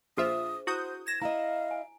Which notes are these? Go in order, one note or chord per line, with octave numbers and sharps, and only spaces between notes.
A#1 D4 F4 G#4 C5 E5 D#6
E4 F#4 C5 D#6 G6
G#6 A#6 E7
E4 D#5 F5 A#5
G#5